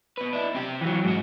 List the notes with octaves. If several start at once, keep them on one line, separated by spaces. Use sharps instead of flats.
B2 B4
D4 E4
C4 G4
E3 F#3
G#2 F#4